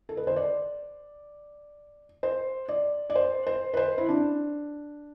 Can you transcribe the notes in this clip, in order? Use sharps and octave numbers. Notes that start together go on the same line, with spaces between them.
A4
B4
C5
D5
C5
D5
D5
C5
C5
B4
C5
E4
D4